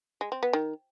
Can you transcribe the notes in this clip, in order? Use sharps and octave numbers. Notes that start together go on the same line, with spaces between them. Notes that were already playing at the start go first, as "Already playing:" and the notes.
G#3
C4
B3
D#3